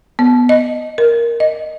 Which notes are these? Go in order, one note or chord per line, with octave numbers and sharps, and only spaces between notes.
B3
D#5
A#4
D#5